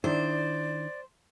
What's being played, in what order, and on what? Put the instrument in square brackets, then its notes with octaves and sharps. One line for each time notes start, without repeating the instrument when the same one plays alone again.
[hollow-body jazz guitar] D#3 D4 E4 [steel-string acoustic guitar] C5 [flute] D5